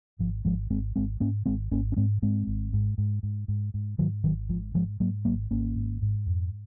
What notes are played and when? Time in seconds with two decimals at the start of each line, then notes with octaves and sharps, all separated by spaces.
0.19 G#1 F3
0.45 G#1 F3 G#3
0.70 G#1 G#3 C4
0.96 G#1 G#3 C4
1.20 G#2 A#3 C#4
1.46 G#1 G#3 C4
1.72 G#1 A#3 C#4
1.92 C#4
1.97 G#2 G#3 C4
2.22 G#2 G#3 C4
2.47 G#1
2.73 G#2
2.98 G#2
3.23 G#2
3.48 G#2
3.74 G#2
3.98 G#2 D#3 F#3
4.24 G#1 D#3 F#3
4.49 G#2 F3
4.74 G#2 F3 G#3
5.00 G#2 F#3 A#3
5.25 G#1 F#3 A#3
5.51 G#1 A#3 C#4
5.76 G#2
6.02 G#2
6.26 F2